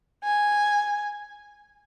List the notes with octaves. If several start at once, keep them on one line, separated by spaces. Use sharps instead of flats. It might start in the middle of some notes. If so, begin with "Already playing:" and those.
G#5